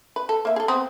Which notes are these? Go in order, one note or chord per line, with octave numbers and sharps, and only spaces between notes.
B4
A4
A#3 E5
G#4 A4
B3 C4